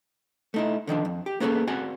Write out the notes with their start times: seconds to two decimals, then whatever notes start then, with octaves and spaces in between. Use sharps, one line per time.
0.54 A3 D#4 E4
0.87 D3 D#3 F3 D4
1.05 F2
1.26 G4
1.40 A#3 B3 C#4 F#4 G#4 A4
1.67 C4 F#4 D5 F#5 G#5